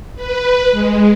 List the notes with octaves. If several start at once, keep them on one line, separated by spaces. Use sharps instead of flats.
B4
G#3